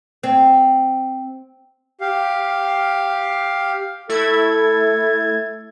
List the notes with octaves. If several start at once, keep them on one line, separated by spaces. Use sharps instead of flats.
C4
G4 F5
A3 E4 A4 G#6